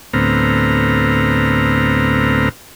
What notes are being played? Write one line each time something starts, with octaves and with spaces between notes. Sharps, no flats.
D2 A2 B3 C4 A#5 F6